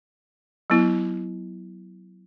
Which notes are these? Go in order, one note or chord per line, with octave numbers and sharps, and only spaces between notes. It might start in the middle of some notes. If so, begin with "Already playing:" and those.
F#3 B3 E4